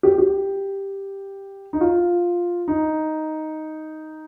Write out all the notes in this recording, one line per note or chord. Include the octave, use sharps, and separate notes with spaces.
G4
G4
D#4
F4
D#4